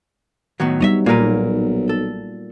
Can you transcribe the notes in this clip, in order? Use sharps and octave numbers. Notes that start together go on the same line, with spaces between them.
A2 D#3 F#3 B3
G3 B3 D#4 C#5 D#5 E5
B1 A#2 A#3 A#4 B4
A4